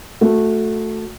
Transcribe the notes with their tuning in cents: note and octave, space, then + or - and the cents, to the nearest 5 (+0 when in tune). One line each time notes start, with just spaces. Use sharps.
A3 +0 F#4 -20